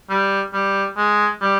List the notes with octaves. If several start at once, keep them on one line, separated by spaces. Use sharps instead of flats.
G3
G3
G#3
G3